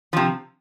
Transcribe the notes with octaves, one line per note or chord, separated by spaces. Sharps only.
C3 F3